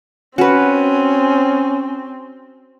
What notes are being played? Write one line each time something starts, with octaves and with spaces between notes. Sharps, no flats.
C4 C#4 F#4 B4